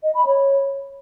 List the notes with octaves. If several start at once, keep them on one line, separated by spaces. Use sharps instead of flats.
D#5
B5
C#5